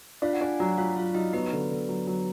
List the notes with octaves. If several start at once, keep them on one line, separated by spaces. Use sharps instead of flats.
D4 F4 F5
F#5
D4 G#4 G#5
G#5
F#3 F#4 F#5
F#3 F4 F5
F#3 F4 F5
F#3 D#4 D#5
F#3 B3 B4
D3
D3
F#3
F#3